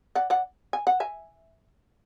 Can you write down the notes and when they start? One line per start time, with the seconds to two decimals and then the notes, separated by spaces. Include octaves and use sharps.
0.15 D5 F#5
0.30 D5 F#5
0.73 G#5
0.87 F#5
1.00 E5 G#5